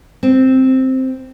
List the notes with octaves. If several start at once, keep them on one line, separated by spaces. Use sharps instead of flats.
C4